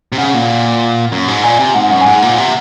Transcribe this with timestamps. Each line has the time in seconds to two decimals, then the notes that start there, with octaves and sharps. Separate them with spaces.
0.12 C3
0.18 C#3 F#5
0.34 A#2
1.12 F#2
1.28 G#2
1.43 A#2 G#5
1.59 C3
1.74 G#2 F#5
1.90 F#2 F#5
2.01 G#5
2.06 G#2 F#5
2.22 A#2
2.38 C3